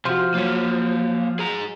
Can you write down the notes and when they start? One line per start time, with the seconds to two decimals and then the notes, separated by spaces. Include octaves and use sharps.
0.05 C3 F3 F#4 C6
0.34 F#3 A#3 C#5
1.39 G#4 A#5